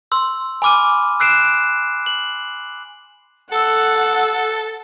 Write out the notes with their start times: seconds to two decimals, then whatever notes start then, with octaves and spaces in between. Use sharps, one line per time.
0.12 C6 E6
0.62 G#5 B5 D6 F6 D#7
1.20 E6 F#6 C7 D7 E7
2.06 F#7
3.52 A4 F#5 E6